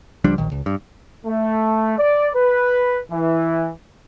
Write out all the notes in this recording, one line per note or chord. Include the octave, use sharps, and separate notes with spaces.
C#2 F3 G3 D4
D1 A#1 D#3
C#2
G2
A3
D5
B4
E3